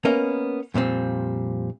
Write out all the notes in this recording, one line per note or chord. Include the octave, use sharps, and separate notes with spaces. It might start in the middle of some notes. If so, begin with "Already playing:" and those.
A#3 B3 C#4 A#4 D#5
F2 A#2 G3 C4